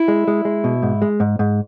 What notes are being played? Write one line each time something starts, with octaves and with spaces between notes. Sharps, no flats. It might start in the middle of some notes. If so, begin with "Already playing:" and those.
Already playing: E4
G#3
G#3
G#3
B2
G#2
G#3
G#2
G#2